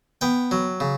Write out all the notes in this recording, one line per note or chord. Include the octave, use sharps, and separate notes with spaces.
B3 G5
F#3
C#3